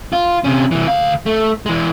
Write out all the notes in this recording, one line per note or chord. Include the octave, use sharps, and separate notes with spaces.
F4
C3 C#4
C2 E3
D2 F5
A3
E3 G#3